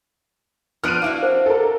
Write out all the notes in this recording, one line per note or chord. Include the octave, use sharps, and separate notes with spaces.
F3 B3 D4 F6 D7 D#7
D4 E4 F#4 F5
C5
A4 A#4